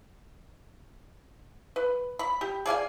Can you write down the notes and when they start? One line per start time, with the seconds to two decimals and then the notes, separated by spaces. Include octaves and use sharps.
1.76 B4
2.19 B5
2.41 G4
2.66 G#4 D5 F5 G#5